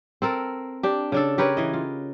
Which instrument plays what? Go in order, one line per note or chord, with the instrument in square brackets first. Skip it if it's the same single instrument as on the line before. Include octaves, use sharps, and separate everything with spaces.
[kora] C4 A4 A#4
D4 G4
C#3 D4 A4
G4 A#4 B4 C#5
E3 D#5
F4